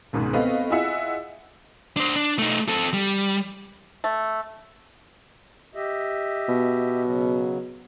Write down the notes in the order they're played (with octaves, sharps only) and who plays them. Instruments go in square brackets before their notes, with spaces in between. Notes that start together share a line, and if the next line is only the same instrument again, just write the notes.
[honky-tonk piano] C#2 G#2 B2 D#3
A3 B3 C4 D#5 F5
E4 F4 G#4 D#5 E5 F#5
[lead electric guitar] D4 C5
D4
A3 D#4
C4 A4
G3
[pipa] A3
[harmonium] G4 D#5 E5
[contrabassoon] B2
[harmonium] C#3 F#3